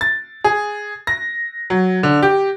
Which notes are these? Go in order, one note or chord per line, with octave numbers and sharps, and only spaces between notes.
A6
G#4
A#6
F#3
D3
G4